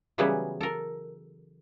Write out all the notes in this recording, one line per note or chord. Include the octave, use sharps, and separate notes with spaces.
C#3 E3 F#3 G3 B3 G#4
A4 A#4